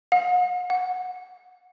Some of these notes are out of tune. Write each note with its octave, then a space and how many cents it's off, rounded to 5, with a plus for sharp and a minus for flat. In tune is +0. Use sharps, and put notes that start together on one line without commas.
F#5 -45
F#5 -15